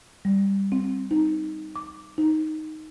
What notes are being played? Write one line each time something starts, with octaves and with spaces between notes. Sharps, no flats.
G3
C4
D#4
D6
D#4